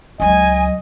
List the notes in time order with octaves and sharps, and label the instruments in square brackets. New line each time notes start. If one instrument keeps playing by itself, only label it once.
[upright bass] C#2 F#3 [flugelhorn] D#5 [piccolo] G#5